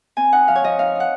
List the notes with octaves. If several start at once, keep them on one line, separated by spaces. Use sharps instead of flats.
C4 G#5
D#4 F#5
F3 F5
C#5
F3 D#5
D#4 F5
D#4 F#5